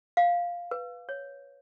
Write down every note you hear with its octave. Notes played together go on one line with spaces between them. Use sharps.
F5
B4
C#5